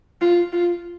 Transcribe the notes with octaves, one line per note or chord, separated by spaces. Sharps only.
F4
F4